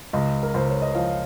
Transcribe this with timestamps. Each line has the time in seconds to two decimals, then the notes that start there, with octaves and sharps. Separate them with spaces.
0.13 C#2 D#5
0.43 A#4
0.54 C#2 C5
0.69 C#5
0.82 D#5
0.95 F3 F5